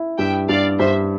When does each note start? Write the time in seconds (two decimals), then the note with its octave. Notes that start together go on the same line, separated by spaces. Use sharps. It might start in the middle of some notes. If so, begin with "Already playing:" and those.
Already playing: E4
0.18 G2 E5 G5
0.49 G2 D5 F5
0.80 G2 C5 E5